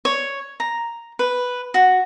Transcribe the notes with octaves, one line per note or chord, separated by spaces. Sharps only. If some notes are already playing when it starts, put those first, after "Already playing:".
C#5
A#5
B4
F#4